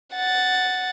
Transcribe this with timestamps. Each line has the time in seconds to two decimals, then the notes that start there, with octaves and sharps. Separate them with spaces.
0.15 F#5 A6